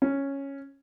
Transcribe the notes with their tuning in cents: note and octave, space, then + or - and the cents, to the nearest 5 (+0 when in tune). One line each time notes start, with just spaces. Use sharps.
C#4 -5